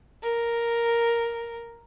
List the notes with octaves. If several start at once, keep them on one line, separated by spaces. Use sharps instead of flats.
A#4